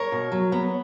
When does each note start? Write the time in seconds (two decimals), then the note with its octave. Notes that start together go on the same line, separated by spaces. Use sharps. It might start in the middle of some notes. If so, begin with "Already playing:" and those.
Already playing: A#4 C#5
0.12 B2
0.32 F#3
0.52 B3